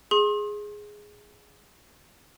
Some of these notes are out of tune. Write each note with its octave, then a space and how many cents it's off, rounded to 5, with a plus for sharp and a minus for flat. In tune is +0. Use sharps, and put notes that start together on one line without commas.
G#4 +0 C6 +35